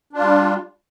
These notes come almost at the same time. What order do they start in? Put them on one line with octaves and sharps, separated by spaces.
D4 F4 G3